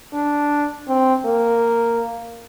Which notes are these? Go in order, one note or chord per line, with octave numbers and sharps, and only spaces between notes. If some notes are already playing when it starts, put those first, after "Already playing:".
D4
C4
A#3